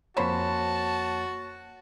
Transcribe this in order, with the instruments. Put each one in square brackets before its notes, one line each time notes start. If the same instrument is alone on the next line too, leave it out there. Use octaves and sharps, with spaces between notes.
[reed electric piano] F2 A#3 C#5 [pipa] C#4 C5 B5 [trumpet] F#4 [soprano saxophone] A5